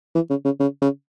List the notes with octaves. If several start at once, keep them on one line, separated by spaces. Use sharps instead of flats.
E3
C#3
C#3
C#3
C#3